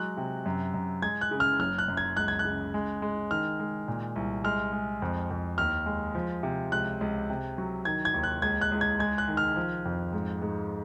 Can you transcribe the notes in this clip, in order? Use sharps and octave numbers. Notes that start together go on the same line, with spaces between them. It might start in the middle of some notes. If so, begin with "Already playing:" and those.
Already playing: F#3 G#3 F#6
C3
F#2
F#2
G#3 G#6
F#6
C#3
F6
F#1 F6
F#6
F#2
G#6
C#2 F#6
G#6
F#6
C#3
G#3
G#3
D#3 F6
G#3
A#2
C2
G#3 F6
G#3
F2
F2
D#2 F6
G#3
F3
C3
C#2 F#6
C#2
C3
F#3
D#3 G#6
G#6
D#2
F#6
C#2 G#6
F#6
C#2
G#6
G#3 G#6
F#6
D#3
F6
F3
F2
G#2
G#2